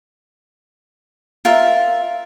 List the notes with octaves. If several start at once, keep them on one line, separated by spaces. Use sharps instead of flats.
F4 A#4 E5